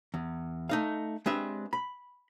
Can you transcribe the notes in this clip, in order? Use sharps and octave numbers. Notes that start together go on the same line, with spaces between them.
E2
A3 D#4 F5
G#3 C4 D4 G4 B4 E5
B5